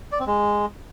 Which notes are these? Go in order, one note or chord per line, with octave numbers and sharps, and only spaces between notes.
D5
C4
G#3